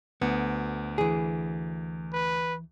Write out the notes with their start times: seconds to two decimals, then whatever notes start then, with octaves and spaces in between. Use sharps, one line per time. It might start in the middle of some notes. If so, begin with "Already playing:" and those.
0.21 D2 B3
0.98 E3 G#4
2.13 B4